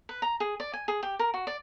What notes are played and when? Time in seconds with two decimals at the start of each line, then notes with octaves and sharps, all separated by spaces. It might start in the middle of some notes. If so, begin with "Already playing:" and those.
0.09 B4
0.22 A#5
0.40 G#4
0.60 D5
0.74 G#5
0.88 G#4
1.03 G4
1.19 A#4
1.34 F#4
1.47 D5